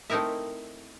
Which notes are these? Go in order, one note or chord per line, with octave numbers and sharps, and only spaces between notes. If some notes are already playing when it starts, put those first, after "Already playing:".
A3 C4 D#4 E4 A#4 E5